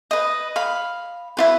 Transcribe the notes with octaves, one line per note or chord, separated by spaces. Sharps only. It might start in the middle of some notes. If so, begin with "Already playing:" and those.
B4 D#5
F5 B5
E4 F4 B4